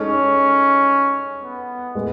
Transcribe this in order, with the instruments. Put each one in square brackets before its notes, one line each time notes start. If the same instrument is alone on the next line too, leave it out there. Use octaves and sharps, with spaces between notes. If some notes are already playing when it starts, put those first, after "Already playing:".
Already playing: [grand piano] G#3 D#4 A4 C#5 [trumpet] C#4
[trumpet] B3
[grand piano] A2 G#3 B3